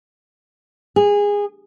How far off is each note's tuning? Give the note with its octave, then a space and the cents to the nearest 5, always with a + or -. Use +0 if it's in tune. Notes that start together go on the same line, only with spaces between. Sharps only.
G#4 -20